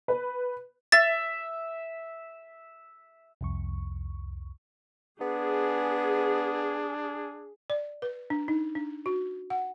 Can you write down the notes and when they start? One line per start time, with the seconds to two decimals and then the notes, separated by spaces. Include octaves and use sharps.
0.08 B4
0.92 E5 A6
3.41 C2 F2 C#6
5.21 B3 D4 G#4
7.70 D5
8.02 B4
8.30 D4
8.48 D#4
8.75 D4
9.06 F#4
9.50 F#5